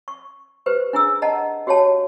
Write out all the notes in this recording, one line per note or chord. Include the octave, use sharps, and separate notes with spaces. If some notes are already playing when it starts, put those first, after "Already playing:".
C#6
G4 B4 C5
D4 E4 G#4 E6
D#5 F#5 A5 A#5
F#4 G4 C#5 F5 A5